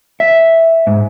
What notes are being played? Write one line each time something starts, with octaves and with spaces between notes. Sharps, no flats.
E5
G#2